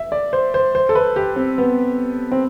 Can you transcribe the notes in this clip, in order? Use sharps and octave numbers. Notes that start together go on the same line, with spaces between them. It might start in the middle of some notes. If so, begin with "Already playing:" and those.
Already playing: E5
D5
C5
C5
C5
A4
B4
G4
C4
B3
C4